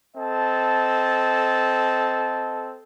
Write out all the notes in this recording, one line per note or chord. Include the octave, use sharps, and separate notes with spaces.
C4 A4 D#5 A5